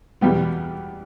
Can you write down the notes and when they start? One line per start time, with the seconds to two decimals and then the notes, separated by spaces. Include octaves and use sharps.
0.21 E2 B2 G3 B3 G4